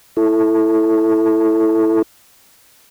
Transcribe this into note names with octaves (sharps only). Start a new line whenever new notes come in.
E4 A4